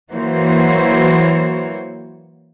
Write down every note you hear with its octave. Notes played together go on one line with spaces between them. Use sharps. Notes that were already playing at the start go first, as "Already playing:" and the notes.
E3 F#3 A#3 F#4 C5 C#5